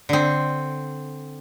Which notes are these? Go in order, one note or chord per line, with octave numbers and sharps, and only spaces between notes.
D3 C4